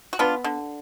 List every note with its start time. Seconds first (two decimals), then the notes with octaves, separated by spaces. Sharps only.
0.13 F#4
0.19 B3 D4 F4
0.44 D3